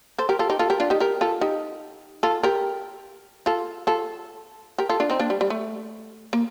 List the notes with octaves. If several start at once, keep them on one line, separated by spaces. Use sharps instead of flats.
A4 C5
G4 A#4
F4 A4
D#4 G4
F4 A4
G4 A#4
D4 F4
D#4 G4
G4 A#4
F4 A4
D#4 G4
F4 A4
G4 A#4
F4 A4
F4 A4
G4 A#4
F4 A4
D4 F4
C4 D#4
A#3 D4
G3
G3
A3
A#3